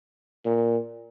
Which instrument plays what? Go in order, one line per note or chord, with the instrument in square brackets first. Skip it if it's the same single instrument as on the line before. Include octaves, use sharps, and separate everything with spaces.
[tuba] A#2